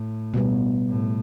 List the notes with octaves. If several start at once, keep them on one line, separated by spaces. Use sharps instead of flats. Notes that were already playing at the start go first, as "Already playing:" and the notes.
Already playing: A2
B2 G3 B3
A2